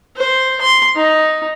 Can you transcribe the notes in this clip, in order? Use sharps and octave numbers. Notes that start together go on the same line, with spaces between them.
C5
C6
D#4